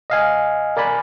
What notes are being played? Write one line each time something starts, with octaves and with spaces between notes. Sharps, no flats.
D#5 F5 G#5
A#4 D5 G#5 B5